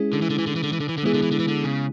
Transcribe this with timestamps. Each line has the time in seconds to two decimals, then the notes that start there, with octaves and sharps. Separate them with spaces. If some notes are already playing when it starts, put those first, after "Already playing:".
Already playing: G#3 C#4 E4 G#4
0.13 D3
0.22 E3
0.30 D3
0.38 E3
0.47 D3
0.56 E3
0.63 D3
0.73 E3
0.80 D3
0.89 E3
0.97 D3
1.03 E3 G#3 B3 E4 G#4
1.14 D3
1.23 E3
1.31 D3
1.39 E3
1.48 D3
1.64 C#3